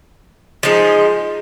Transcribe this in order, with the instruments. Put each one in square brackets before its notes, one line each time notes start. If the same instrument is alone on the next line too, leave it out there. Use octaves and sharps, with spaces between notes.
[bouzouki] F3 G#3 D#4